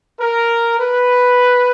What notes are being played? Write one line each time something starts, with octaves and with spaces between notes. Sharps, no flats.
A#4
B4